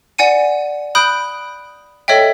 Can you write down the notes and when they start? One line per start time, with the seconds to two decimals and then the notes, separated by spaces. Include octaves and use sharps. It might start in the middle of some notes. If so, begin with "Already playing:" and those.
0.18 D5 F#5 G#5 C#7 D#7
0.95 B5 D#6 F#6 G6 D7
2.08 A4 C#5 D#5 E5 G5